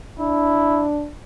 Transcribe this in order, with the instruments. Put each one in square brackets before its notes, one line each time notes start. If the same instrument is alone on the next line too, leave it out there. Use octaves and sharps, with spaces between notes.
[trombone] D4 [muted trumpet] E4